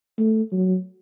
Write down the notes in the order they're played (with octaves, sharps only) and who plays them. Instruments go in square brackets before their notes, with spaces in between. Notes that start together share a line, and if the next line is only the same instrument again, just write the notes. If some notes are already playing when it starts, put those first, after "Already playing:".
[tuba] A3
F#3